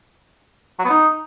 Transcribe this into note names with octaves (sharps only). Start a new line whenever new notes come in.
F#3
B3
D#4